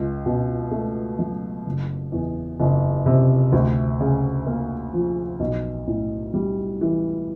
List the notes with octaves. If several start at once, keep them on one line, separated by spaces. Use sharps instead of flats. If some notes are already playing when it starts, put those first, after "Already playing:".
Already playing: C#2
B2
A3
F#3
F#1
E2
F#1
C3
D2
C#3
A#3
F3
B1
A2
G3
E3